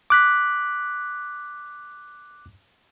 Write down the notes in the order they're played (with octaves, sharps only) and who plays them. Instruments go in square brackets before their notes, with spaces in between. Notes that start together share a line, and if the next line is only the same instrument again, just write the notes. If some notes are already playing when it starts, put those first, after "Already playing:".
[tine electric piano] D6 F#6 B6